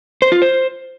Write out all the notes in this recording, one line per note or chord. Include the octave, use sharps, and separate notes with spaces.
C5
F4
C5